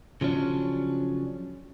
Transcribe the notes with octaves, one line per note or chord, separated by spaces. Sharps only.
C#3 F3 F#3 C#4 D4